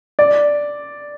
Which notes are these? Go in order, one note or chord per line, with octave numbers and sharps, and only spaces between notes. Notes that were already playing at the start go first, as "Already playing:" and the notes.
D5